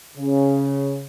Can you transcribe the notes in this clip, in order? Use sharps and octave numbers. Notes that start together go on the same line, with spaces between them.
C#3